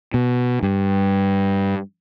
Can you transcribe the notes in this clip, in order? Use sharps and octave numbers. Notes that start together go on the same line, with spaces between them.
B2
G2